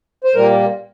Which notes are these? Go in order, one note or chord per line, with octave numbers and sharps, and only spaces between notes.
C5
A#2 G3 A#3 A#4